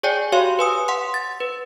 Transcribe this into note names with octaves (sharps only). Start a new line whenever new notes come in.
G#4 C#5 D5 G5 G#5
F#4 G4 C#5 F5 C6
B4 G#5 D#6
F#5 C6
A6
B4